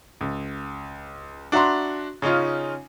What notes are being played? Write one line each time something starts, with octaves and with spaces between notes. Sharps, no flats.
C#2
D4 F#4 E5 A#5 C6
C#3 C#4 D#4 F4